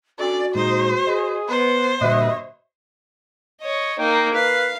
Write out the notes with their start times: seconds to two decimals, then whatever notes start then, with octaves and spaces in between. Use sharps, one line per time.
0.19 C#4 D4 F#4 A4 D5
0.55 A#2 G#3 D#4 C5
1.07 G#4 D#5
1.49 B3 C5
2.01 G2 A#2 D3 G3 F#4 D#5 E5
3.61 C#5 D#5
3.99 A#3 D#4 G5
4.34 B4 F5